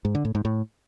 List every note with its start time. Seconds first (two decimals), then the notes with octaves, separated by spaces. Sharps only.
0.05 G#2
0.15 D3
0.25 A2
0.35 G#2
0.45 A2